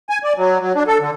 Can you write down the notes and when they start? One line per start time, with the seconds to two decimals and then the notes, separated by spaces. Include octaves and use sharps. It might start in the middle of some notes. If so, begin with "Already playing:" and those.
0.10 G#5
0.24 D5
0.37 F#3
0.60 F#3
0.75 D4
0.87 A4
1.00 D3